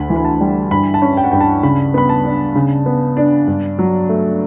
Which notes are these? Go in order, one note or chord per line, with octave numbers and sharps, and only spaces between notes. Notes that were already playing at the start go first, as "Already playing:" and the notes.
Already playing: D2 B5
E3
B5
A5
G3
G2 B5
A5
C#4
G5
F#5
G2 G5
A5
C#3 B5
B3 B5
A5
D4
C#3
B3
D4
G2
F#3
A3